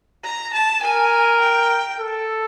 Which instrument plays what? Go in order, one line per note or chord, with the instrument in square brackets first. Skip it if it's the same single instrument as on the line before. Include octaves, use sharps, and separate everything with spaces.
[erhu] A#5
A5
[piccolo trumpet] A#4 [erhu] G#5
[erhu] G5
[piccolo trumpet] A4